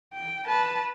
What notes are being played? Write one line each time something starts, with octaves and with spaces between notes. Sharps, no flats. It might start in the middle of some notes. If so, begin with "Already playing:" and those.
G5
B4 A5